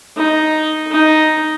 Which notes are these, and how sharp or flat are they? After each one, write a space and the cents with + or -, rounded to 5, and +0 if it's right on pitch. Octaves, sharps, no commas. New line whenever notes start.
D#4 +0
D#4 +0